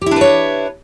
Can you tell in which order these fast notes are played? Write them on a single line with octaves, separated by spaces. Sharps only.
G4 E4 D4 B4 C#5